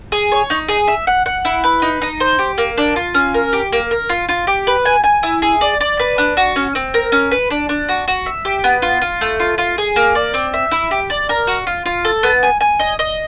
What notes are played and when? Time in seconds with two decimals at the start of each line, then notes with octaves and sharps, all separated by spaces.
0.12 G#4
0.32 C#5
0.50 D#4
0.69 G#4
0.88 E5
1.07 F#5
1.26 F#5
1.45 E4
1.64 B4
1.82 D#4
2.02 D#4
2.20 C5
2.39 G4
2.58 A#3
2.78 D4
2.96 F4
3.15 C#4
3.34 A#4
3.53 G4
3.72 A#3
3.91 A#4
4.09 F4
4.29 F4
4.47 G4
4.67 B4
4.85 G#5
5.04 G#5
5.23 E4
5.42 G#4
5.61 D5
5.81 D5
6.00 B4
6.18 D4
6.37 F#4
6.56 C#4
6.75 C4
6.94 A#4
7.12 C#4
7.31 B4
7.51 D4
7.69 D4
7.89 F#4
8.08 F#4
8.26 E5
8.45 G4
8.64 B3
8.82 F4
9.02 F4
9.21 A3
9.40 F4
9.58 F4
9.78 G#4
9.96 A#3
10.15 D5
10.34 C4
10.54 E5
10.71 E4
10.91 G4
11.10 D5
11.29 A#4
11.47 F#4
11.67 F4
11.86 F4
12.05 A4
12.23 B3
12.43 G#5
12.61 G#5
12.79 D#5
12.99 D#5